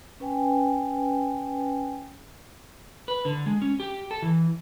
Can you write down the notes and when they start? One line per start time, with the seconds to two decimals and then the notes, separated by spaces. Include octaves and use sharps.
0.20 C#4 B4 G5 G#5
3.08 B4
3.25 D3
3.46 G#3
3.62 C#4
3.80 G4
4.11 A4
4.22 E3